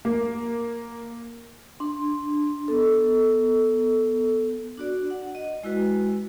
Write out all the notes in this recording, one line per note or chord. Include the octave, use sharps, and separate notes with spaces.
A#3
D4 C6
B3 A4
D4 F#4 D5
F#5
D#5
G#3 E4 F#4 B4 G#5